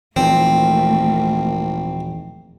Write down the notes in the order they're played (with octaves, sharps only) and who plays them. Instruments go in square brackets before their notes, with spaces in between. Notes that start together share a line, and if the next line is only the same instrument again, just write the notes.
[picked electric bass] D#1 E3 F3 [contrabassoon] G#1 [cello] A3 A#3 [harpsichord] C4